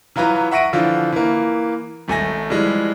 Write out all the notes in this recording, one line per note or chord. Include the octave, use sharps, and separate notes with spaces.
E3 F#3 F4 B4 A#5
E5 F#5 C#6 A#6 D7 D#7
D3 E3 F3 F4
E3 A#3
G#1 A3 G#5 A#6
E3 F3 G3 G#3